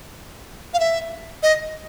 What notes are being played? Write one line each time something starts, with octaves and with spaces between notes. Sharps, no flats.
F5
E5
D#5